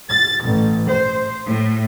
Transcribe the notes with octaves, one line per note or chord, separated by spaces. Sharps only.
A6
A1
C5
A2